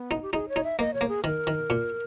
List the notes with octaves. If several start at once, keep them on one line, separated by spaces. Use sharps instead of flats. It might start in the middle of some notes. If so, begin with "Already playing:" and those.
Already playing: B3
D#4
G4
D#4 G#4
C#5
D#4
E5
A#3 D#5
C#5
A#3
G#4
D#3 A#4
D#3
A#2